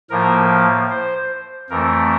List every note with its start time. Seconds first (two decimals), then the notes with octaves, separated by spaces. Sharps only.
0.10 A2 F3 A#3 A#4
0.90 C5
1.70 F2 E3 A3 A#4